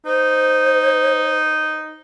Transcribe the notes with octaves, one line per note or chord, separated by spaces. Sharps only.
D#4 C5